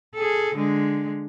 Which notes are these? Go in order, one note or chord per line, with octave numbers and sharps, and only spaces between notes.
G#4 A4
D3 G#3